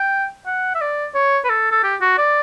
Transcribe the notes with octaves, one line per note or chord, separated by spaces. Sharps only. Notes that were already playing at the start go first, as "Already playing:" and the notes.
Already playing: G5
F#5
E5
D5
C#5
B4
A4
A4
G4
F#4
D5